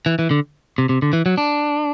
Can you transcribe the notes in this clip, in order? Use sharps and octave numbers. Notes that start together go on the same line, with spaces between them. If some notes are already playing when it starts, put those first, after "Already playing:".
E3
E3
D3
C3
C3
D3
E3
F#3
D4